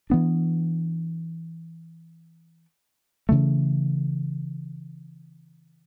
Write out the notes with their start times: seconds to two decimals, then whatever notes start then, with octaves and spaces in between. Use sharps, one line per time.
0.10 E3 B3 D4
3.29 C#3 E3 A3